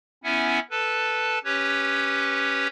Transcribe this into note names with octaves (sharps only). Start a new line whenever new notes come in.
B3 C#4 E4 E5 F#5 G#5
A4 B4 A5
C#4 G4 B4 C#5